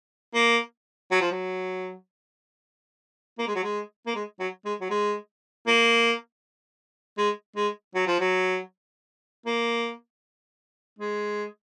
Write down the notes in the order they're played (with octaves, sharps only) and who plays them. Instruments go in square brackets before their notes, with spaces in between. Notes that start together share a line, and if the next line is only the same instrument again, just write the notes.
[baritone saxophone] A#3
F#3
F3
F#3
A#3
G#3
F#3
G#3
A#3
G#3
F#3
G#3
F#3
G#3
A#3
G#3
G#3
F#3
F3
F#3
A#3
G#3